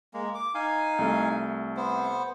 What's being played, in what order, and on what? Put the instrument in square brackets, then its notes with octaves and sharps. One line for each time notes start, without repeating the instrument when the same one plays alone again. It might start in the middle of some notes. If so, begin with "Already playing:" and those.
[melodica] G#3 A#3
D6
D#4 F5 G#5
[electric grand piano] C2 A3
[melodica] B3 C5